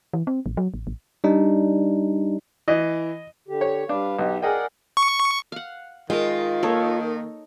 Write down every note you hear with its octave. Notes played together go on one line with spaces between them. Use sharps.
E3
C4
A1
F#3
A1
A1
G3 D4 D#4
E3 D#5
D3 G4
C#5
G3 D4 B4 F5
B1 D#4 G4
G#4 A#4 D5 D#5 F#5 G5
C#6
F5 F#5
D#3 G#3 F4 A#4
A#3 D#4 A4 A#4 C#5